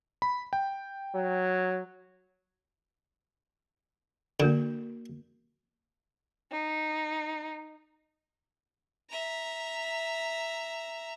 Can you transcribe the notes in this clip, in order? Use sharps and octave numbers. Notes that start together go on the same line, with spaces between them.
B5
G5
F#3
D3 A#3 F#4 A#4
D#4
E5 A#5